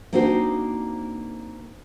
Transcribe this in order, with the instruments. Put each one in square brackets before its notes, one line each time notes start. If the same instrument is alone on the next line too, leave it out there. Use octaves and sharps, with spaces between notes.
[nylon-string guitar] A#3 C4 D4 D#4 F#4 C5